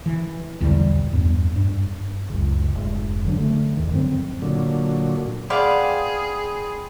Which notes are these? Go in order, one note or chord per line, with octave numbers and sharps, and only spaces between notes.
E3
B1 E2 D3 G3
E2 G2
G2
C#2 F#2 C#3
F1 G#2
D3 F#3 D4
D3 A3
E2 D#3
G2 D3 F#3 C4
A#2 D3 F#3
B3 G#4 D5 F5 G5 B5 C6